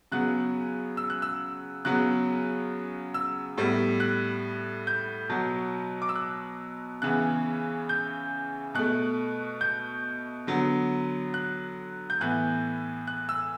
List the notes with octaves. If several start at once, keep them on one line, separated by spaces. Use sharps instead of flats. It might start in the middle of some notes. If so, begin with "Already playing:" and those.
C#3 F#3 B3 F#6
E6
F#6
E6
C#3 F#3 B3 F#6
E6
A2 G3 B3
F#6
G6
B2 F#3 B3
D6
E6
F#6
C#3 E3 B3 F#6
G6
B2 A3 F#6
G6
D3 F#3 B3
F#6
G6
A2 E3 B3 F#6
F#6
E6